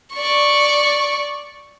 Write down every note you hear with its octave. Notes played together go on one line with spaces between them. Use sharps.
D5 C#6